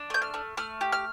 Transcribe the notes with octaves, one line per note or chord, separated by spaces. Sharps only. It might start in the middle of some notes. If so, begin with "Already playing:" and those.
Already playing: D4
A3 G6
F6
A3
A3 F6
G4
F6